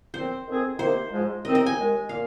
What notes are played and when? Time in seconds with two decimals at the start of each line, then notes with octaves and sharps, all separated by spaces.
0.14 A#2 F3 C4 C5
0.47 F2 D#3 C4 G#4
0.79 C3 D#3 A#3 D#4 C5
1.12 G#2 F3 G#3
1.44 D#2 D#3 C4 D#4 D#5
1.55 D#5
1.66 G#5
1.77 D#2 D#3 G#3
2.09 A#2 A#3 F5